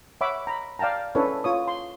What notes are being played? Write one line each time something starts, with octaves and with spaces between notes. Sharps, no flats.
C#5 E5 F#5 B5 D6
A#5 B5
D5 F5 G5 A5 A#5
C#4 D4 E4 A4 B4 C#5
F4 C#5 D#6
C6